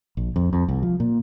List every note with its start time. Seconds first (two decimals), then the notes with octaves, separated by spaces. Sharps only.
0.17 A#1
0.36 F2
0.53 F2
0.69 C2
0.83 F3
1.00 A#2